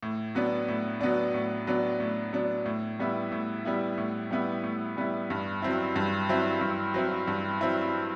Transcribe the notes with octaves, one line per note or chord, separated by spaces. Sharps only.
A2
F#3 B3 D4
A2
F#3 B3 D4
A2
F#3 B3 D4
A2
F#3 B3 D4
A2
G3 B3 E4
A2
G3 B3 E4
A2
G3 B3 E4
A2
G3 B3 E4
G2
F#3 C4 E4
G2
F#3 C4 E4
G2
F#3 C4 E4
G2
F#3 C4 E4